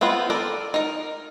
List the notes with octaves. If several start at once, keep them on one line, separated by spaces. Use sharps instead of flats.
G#3 B3 C4 F4
A4 A#4 D5
D#4 A#4